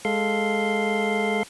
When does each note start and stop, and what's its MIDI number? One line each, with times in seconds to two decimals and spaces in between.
0.05 1.43 56
0.05 1.43 69
0.05 1.43 77
0.05 1.43 84